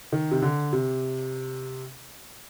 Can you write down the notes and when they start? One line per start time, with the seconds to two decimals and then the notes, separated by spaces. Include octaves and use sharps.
0.12 D#3
0.31 C3
0.42 D3
0.73 C3